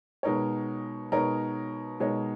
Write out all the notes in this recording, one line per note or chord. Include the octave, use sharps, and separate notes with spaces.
B2 G#3 D#4 A#4 C#5
B2 G#3 D#4 A#4 C#5
B2 G#3 D#4 A#4 C#5